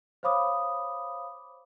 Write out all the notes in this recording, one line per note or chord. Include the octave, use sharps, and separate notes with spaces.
C5 C#5 F5 B5 D6 D#6